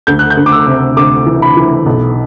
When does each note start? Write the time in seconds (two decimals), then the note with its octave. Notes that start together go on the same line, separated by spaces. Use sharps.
0.07 D2 G6
0.19 F#6
0.30 G6
0.37 D2
0.46 D6
0.52 E6
0.67 C3
0.97 D2 D6
1.26 E3
1.42 B5
1.57 E3
1.86 B1